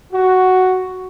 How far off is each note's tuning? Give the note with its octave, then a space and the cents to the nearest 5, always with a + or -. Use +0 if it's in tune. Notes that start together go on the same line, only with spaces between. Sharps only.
F#4 +5